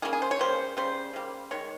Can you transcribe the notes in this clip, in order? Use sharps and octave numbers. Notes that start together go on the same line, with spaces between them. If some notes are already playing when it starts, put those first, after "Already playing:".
C#3 G3 A#3 G#4
G#4
C5
C#5
C#3 G3 A#3 C5
C#3 G3 C5
C#3 G3 A#3
D#3 G#3 C#5